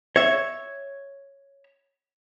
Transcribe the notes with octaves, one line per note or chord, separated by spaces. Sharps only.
C#5 E5